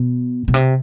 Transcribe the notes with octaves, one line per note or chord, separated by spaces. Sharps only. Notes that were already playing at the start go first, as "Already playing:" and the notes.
Already playing: B2
B2
C3